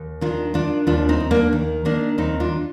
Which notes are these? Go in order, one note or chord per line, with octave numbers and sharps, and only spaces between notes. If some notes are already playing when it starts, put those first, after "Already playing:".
Already playing: D#2
D#3 D4 F4
D#3 D4 F4
D#2 D4 F4
C4 D#4
D#2
A#3 D4
D#3
D#3 A#3 D4
D#2 C4 D#4
D4 F4